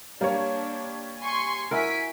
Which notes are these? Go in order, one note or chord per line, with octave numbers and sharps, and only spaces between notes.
G3 A#3 D4 C#5
G#5 C6 C#6
E4 F#4 A#4 G#5 B6 D7